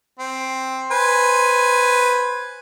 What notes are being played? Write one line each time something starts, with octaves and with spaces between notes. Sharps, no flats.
C4
B4 C5 G#5